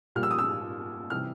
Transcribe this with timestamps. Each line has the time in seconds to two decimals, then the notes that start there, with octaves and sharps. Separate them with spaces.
0.15 A#2 G3 F6
0.23 E6
0.31 D#6
0.38 E6
1.10 C3 E3 G3 F6